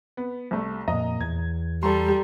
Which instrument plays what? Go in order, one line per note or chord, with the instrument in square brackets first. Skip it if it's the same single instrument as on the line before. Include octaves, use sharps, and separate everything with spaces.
[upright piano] B3
C2 A3
[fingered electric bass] F2 A#2 [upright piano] D#5 A#5
[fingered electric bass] E2 [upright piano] G#6
[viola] G3 [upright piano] A4 A#5 C6